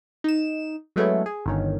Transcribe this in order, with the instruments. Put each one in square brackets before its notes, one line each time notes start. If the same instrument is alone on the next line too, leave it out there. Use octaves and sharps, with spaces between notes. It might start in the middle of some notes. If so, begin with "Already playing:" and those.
[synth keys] D#4 E7
F#3 G#3 A3 B3 C#4 E4
G#4
G1 D#3 C#4